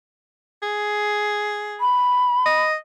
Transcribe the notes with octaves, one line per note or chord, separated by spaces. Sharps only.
G#4
B5
D#5